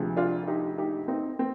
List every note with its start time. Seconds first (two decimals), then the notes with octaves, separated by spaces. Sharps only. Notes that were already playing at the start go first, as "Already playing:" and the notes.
Already playing: D2 C3 F3 G#3
0.17 D4 F4
0.47 D#4 G4
0.78 D#4 G4
1.08 C4 D#4
1.39 C4